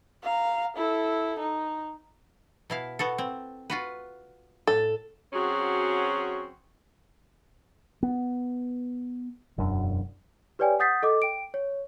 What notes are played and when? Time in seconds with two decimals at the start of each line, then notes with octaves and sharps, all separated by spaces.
0.23 F5 A#5
0.77 E4 A4
1.39 D#4
2.70 B2 E4 F5
2.99 B3 F#4 A4
3.18 C4
3.70 F4 F#4 B4
4.67 A2 A4
5.33 F#3 C4 C#4 F#4 G#4
8.03 B3
9.58 E1 F#2 D4
10.59 G4 B4 C#5 D5 G5 G#5
10.79 F#5 D#6 G6 A6 B6 C7
11.03 A4 D#5 D6
11.22 G5 D7
11.54 C#5